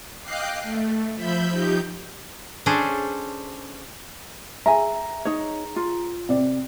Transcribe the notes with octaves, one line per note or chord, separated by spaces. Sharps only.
D#5 F5 G5 D6 F#6 C7
A3
F3 E5 B5 G6
F3 D#4 G4 G6
C#4 D4 G#4 A4 C5
G#4 E5 G#5 A#5
D#4 C#5
F4
C3 D5